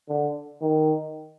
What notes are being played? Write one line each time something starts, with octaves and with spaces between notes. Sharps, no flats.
D3
D#3